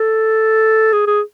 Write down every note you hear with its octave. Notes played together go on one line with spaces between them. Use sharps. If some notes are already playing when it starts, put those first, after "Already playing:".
Already playing: A4
G#4
G#4